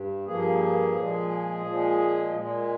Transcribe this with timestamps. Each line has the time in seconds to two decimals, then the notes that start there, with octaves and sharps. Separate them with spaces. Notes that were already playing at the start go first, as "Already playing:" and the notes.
Already playing: G2
0.25 G2 F3 A#3 G#4
0.96 A#2 F3 G#3
1.66 A#2 F3 G#3
2.36 A#2 G#3